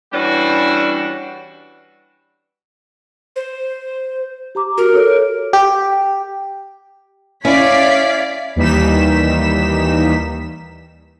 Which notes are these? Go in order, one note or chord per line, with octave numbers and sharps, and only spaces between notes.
E3 G3 C#4 D4 F#4
C5
G4 A#5 D6
F#4 A#4
A4 C#5
G4
C#4 E4 C#5 D5 F5 B6
D#2 E3 G3 D#4 B6 E7